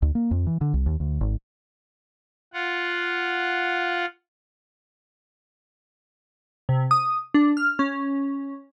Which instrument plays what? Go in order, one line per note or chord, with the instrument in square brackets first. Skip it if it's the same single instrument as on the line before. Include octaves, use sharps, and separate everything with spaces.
[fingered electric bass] D2
A#3
F2
E3
D3
C2
D#2
D2
G#1
[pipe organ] F4 F#5
[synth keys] C3
D#6
D4
F6
C#4